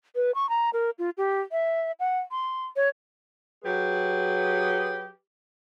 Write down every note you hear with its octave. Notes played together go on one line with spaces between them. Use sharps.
B4
C#6
A#5
A#4
F4
G4
E5
F#5
C6
C#5
F#3 G4 G#4 B4